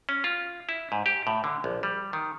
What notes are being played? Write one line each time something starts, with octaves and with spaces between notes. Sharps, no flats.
C#4
F4
E4
G#2
G4
A2
D3
A#1
G3
D#3